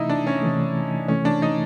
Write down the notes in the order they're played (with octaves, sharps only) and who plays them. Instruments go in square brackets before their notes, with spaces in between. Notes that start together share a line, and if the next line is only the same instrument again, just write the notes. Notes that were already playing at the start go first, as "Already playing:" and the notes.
Already playing: [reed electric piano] C3 E3 A3 [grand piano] D#4 E4
[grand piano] D4
C#4
[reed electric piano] C3 E3 A3
[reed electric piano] C3 E3 A3 [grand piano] C#4
[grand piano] D4
D#4